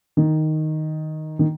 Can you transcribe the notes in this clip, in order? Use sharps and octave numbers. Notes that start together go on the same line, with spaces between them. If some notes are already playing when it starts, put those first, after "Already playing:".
D#3
D#3